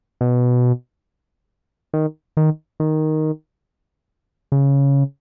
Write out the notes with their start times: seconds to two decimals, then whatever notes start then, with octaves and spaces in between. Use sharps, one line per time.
0.21 B2
1.93 D#3
2.37 D#3
2.80 D#3
4.52 C#3